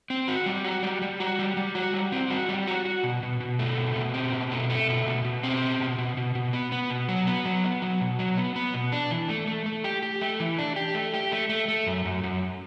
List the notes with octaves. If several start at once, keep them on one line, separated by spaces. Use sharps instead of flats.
C4
F#4
G3
F#4
G3
G3
F#4
G3
G3
F#4
G3
C4
F#4
G3
F#4
F#4
B2
B2
B2
A3
B2
B2
C4
B2
A3
A3
B2
B2
B2
C4
B2
B2
B2
B2
B2
B3
B3
B2
F#3
B3
F#3
B3
F#3
B2
F#3
B3
B3
B2
D4
E3
A3
A3
A3
G4
G4
A3
E3
D4
G4
A3
G4
A3
A3
A3
F#2
F#2
F#2